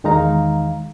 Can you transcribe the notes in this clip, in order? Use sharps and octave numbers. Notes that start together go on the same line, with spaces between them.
E2 D#3 G#3 D#4 F5 A#5